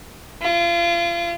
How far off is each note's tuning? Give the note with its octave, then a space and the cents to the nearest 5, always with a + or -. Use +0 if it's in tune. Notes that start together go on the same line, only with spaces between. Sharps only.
F4 -35